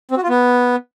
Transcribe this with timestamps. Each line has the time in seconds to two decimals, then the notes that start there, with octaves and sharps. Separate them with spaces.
0.11 C4
0.17 F#4
0.23 F4
0.29 B3